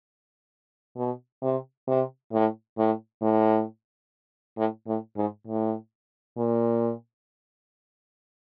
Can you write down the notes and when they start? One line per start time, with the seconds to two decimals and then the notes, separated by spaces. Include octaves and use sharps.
0.97 B2
1.42 C3
1.88 C3
2.32 A2
2.77 A2
3.22 A2
4.57 A2
4.87 A2
5.16 G#2
5.47 A2
6.37 A#2